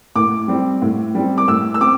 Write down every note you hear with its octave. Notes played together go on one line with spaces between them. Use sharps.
A2 D6
G3 C4
A2
G3 C4
D6
A2 E6
E6
C4 D6